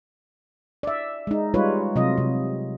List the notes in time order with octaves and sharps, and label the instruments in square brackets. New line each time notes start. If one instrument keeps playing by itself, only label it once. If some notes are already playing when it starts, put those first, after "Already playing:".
[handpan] D5 E5
G#3 D#4
G3 G#3 D#4 F4 B4 C#5
C3 F#3 F4 D#5
C3